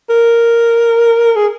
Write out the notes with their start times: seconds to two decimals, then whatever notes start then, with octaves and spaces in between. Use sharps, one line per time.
0.09 A#4
1.36 G#4